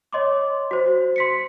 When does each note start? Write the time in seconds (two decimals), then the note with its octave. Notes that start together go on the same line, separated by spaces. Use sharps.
0.13 C#5 D#5 C6 D6
0.71 F#4 C5
1.16 C6 B6 C#7